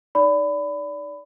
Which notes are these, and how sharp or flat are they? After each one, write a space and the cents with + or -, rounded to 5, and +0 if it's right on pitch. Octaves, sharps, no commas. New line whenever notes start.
D#4 +0 D5 -25 B5 +20